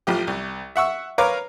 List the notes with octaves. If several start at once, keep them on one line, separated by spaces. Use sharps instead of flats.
A1 F3 G4
C2
E5 F#5 C#6 E6
A#4 B4 C#5 F5 D6